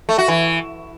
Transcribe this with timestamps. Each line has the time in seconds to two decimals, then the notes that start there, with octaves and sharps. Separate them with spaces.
0.09 A3
0.19 F#4
0.28 E3